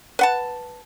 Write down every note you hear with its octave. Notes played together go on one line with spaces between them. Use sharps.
B4 F#5 A5